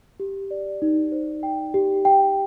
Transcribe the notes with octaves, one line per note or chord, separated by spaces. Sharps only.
G4
D5
D#4
C5
G5
G4
G5